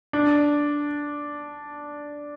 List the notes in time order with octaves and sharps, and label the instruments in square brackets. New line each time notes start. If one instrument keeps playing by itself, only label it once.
[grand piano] D4